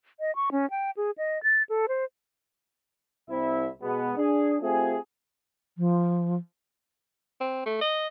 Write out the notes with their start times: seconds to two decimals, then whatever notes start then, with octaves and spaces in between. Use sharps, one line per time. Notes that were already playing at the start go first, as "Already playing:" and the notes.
0.20 D#5
0.36 C#6
0.52 C#4
0.71 G5
0.97 G#4
1.18 D#5
1.43 A6
1.69 A4
1.88 C5
3.29 C2 C4 E4 E5
3.82 B2 G#3 B3
4.16 D4 G#4
4.62 A3 C4 F4 G4 G#4
5.76 F3
7.40 C4
7.66 A3
7.81 D#5